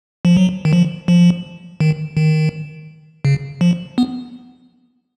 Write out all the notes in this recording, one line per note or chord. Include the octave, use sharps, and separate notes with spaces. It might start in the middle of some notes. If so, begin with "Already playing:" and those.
F3
F#3
D#3
F3
F3
D#3
D#3
C#3
F3
B3